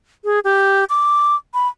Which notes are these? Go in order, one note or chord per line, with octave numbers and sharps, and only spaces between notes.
G#4
G4
D6
B5